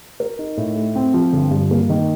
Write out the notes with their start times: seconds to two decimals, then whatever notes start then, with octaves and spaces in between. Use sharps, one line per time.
0.20 A#4
0.39 D#4
0.57 A2
0.76 A3
0.96 C4
1.14 F3
1.33 G1
1.51 G2
1.71 A#3
1.90 D#3